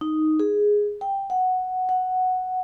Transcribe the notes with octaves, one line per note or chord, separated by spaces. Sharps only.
D#4
G#4
G5
F#5
F#5